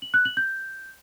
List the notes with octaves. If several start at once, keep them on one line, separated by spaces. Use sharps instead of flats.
F#7
F#6
F#7
G6